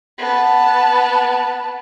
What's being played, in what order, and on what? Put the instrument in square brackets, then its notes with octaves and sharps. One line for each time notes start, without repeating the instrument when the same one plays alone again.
[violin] B3 A5